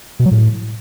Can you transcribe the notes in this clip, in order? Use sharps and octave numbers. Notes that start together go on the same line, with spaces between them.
B2
F#3
A2